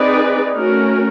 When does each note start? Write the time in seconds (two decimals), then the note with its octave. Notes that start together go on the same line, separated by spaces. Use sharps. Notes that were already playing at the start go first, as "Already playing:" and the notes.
Already playing: C4 D#4 G#4 B4 D5
0.55 A3 C#4 F#4 A#4